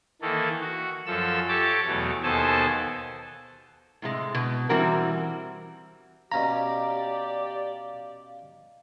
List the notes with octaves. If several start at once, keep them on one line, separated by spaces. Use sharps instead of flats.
D#3 E3 A#3 A4
F#4
F#2 F3 A4 E6
G4 A4 C#5 A5 D6
E2 B2 F#3 A3
D#2 B2 A4 C5 G#5 A5
A2 C3 G#3
B2
E3 G3 C4 F#4 A#4
B2 C#4 G4 D5 F5 A#5 B5